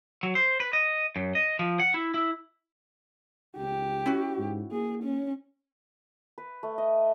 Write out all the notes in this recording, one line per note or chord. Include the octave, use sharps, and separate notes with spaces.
F#3
C5
B4
D#5
F#2
D#5
F3
F#5
E4
E4
C#2 G4
C#4 E4 F#4
G#2
A#3 G#4
C#4
B4
A3
D#5